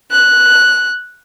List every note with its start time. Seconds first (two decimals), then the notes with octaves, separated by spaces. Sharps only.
0.11 F#6